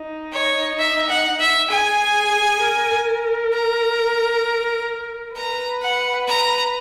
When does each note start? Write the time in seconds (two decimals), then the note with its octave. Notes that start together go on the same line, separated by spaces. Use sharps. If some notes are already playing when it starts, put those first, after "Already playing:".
Already playing: D#4
0.32 C#5
0.78 E5
1.09 F#5
1.40 E5
1.70 G#4 G#5
2.61 A#4
3.53 A#5
5.36 B4 A#5
5.82 F#5
6.28 A#5